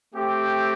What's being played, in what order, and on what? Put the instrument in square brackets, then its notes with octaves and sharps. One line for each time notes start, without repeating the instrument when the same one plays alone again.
[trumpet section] A3 C4 G4